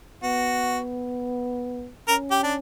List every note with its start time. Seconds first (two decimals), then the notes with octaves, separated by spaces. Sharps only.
0.23 B3 F#4
2.08 C#4 A#4
2.31 G4
2.43 D4